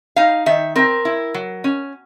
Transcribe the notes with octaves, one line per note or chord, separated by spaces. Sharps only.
D#4 F5
D#3 E5
C4 A#4
E4
F#3
C#4